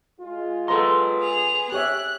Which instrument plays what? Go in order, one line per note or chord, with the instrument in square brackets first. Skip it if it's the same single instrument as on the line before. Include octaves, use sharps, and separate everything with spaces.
[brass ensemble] G#3 F4
[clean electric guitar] B3 C6 [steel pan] A4 B4 A#5
[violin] G#4 F7
[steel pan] G4 C#5 E5 [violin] F#6